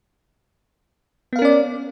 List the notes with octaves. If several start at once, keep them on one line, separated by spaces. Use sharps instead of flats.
B3 C#4 A#4 D5 F5